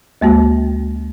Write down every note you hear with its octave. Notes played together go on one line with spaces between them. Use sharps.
D2 G#3 A#3 F#4